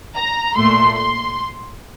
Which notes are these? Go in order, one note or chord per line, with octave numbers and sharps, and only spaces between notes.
A#5
A#2 A3 C6
C6